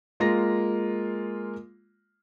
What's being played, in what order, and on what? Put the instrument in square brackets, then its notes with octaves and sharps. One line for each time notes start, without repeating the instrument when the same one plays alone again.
[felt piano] G#3 A#3 F4 A#6